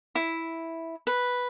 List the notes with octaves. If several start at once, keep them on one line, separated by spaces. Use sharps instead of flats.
E4
B4